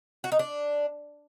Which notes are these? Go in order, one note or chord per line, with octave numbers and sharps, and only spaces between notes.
F#4
D#4
D4